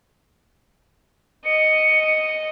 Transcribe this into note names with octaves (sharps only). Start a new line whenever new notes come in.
D#5 C#7